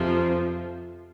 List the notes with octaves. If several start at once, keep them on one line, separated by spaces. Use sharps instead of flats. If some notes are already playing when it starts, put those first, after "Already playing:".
Already playing: F2 C3 F3